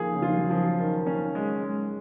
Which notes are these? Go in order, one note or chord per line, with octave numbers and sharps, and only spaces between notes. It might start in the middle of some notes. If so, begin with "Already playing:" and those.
Already playing: D#3 F3 A#3 G#4
C#3
D#3 F4
F3
F#3
F3
D#3
C#4
G#3
G#3